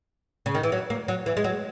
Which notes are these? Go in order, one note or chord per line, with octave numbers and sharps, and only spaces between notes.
C#3
D#3
E3
F#3
A#3
F#3
E3
G#3
F#3